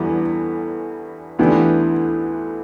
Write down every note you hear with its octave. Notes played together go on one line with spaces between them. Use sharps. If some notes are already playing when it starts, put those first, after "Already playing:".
Already playing: E2 D3 E3 G3 B3
D2 D3 E3 B3 D4 G4